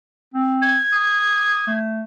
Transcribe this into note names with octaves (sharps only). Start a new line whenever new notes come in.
C4
G#6
D#6
A3